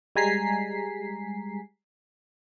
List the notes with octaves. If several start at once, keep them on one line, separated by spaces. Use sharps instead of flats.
G3 G#3 G#5 A#5 B6 C7